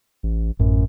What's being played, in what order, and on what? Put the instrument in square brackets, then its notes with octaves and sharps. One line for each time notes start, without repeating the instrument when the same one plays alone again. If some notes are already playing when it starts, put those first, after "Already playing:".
[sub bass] A1
[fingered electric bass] A1 [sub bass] F#2